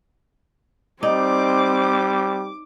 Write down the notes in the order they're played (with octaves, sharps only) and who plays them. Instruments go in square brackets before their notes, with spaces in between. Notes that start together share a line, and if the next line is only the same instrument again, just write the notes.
[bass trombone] G3 [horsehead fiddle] C4 [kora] D#4 D5 [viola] D6